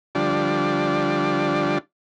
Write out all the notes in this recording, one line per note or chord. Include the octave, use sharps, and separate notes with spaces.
D3 F3 G3 D4